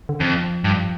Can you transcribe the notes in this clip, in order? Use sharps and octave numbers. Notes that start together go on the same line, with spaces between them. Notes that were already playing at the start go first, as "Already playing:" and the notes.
D3
F2 F3
G2